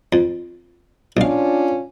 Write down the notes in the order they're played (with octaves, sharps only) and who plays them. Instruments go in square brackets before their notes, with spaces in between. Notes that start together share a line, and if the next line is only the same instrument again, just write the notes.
[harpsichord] F2
[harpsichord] B1 F5 [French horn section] C#4 D4 F4